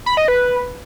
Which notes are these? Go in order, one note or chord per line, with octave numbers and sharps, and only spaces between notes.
B5
D#5
B4